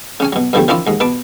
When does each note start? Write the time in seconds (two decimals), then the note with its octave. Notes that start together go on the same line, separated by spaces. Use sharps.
0.20 C#3 C#4 G#5
0.32 B2 F#3
0.53 G2 B2 D3 F3 G3 A3
0.68 D#3 F3 C#4 E4 F4 D5
0.87 D#2 G#2
1.00 B2 B4 A5 D6